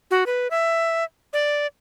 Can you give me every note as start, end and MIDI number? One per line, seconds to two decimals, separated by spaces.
0.11 0.24 66
0.26 0.48 71
0.51 1.04 76
1.33 1.67 74